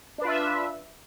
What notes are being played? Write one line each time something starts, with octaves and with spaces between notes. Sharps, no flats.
D4 F4 B4 E5